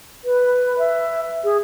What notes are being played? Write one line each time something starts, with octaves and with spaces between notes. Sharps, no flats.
B4
E5
G#4